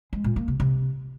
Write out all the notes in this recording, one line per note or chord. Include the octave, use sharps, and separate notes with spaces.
G#3
A#2
A#3
C3
C3